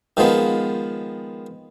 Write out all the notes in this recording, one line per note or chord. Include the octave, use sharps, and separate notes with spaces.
D#3 F3 G#3 B3